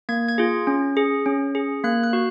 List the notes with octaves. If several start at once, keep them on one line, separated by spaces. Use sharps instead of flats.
A#3 G#6
G#6
F4 G#4
C#4
G#4
C#4
G#4
A#3 F#6
F#6
F#4